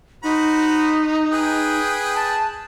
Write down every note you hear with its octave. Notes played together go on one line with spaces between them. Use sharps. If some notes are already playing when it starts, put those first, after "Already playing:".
D#4 F#4 C5 B5
G#4 B4 G5
A5